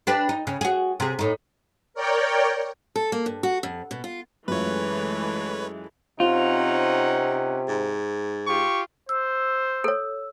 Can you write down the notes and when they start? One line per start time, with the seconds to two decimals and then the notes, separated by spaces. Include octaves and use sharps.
0.07 D4 G4 B4
0.29 D#4
0.47 C#3
0.61 F#4 G#4
1.00 C3 G#4
1.19 A2 D#4
1.94 A#4 C#5 D5 G5
2.96 A4
3.12 A#3
3.26 G2
3.43 F#4
3.63 F2
3.91 B2
4.04 F4
4.48 F#2 E3 G#3 A3 F4 B4 C#5
6.20 C3 C4 C#4 D#4 F4 F#5
7.68 G#2
8.47 F4 G4 C#6
9.09 C5 E6
9.84 A4 C#5